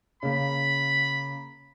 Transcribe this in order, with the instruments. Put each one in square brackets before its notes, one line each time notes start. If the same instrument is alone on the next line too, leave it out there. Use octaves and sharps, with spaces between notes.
[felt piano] C#3 A#3 [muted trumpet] B5